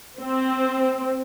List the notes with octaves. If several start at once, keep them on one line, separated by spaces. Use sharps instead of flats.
C4